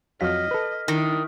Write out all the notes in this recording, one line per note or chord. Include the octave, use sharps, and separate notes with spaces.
F2 F#3 D#5 F5 F6 B6
A4 B4
D#3 D4 E4